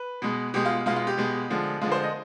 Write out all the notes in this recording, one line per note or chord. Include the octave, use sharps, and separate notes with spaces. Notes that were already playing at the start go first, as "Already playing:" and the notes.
Already playing: B4
B2 G#3
B2 G#3 G4
F4
B2 G#3 F4
F4
G4
B2 G#3
D3 F3 G#3
D3 F3 G#3 F4
C5
D#5